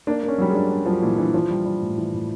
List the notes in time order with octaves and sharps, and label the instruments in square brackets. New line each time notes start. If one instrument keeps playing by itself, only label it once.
[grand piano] A#3 [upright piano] D4
[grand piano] A#3
[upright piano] C#4
[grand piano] F#3 [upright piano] G3
[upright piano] G#3
[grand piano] D4
D4
[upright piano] F3 [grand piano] F#3
[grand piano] A#2 [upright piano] E3
[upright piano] E3 [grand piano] D4
[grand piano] E3 [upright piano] F3
[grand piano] G3
G3
A2
E3
A2